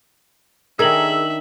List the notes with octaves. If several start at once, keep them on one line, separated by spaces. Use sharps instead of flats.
D#3 D4 D#4 G#4 A#4 E5 E6 F#7